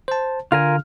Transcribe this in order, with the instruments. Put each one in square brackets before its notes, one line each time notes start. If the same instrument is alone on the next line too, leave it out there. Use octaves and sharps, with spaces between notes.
[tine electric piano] C5 A5
[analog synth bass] D3 [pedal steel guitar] F4 A#4 G#5 [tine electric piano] F6